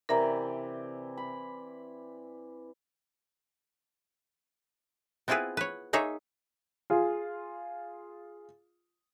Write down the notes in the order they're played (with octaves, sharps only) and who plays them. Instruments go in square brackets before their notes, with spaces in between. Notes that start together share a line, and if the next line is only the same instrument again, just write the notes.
[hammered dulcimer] C3 E3 D5 [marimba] A#4 E5 A#5
[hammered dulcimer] B5
[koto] B3 C4 E4 F4 G#4 B4
B4 C#5
A#3 D#4 G#4 C#5 E5
[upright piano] F4 G#4